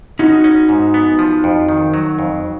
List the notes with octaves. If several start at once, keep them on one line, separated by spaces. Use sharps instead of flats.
C#4 D#4 F#4
C#4
G#2
B3
F3
F2
D#3
F#3
F2